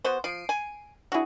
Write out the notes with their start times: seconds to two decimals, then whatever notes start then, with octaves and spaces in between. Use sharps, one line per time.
0.04 B3 F#4 C5
0.24 F3 C7 D7 D#7
0.49 G#5
1.12 D4 E4 F#4 G#4